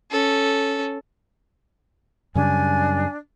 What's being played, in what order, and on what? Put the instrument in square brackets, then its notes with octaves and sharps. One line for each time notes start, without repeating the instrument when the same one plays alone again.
[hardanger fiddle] C#4 A4
[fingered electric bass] F#2 C#3 G3 [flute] D4 [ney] G#5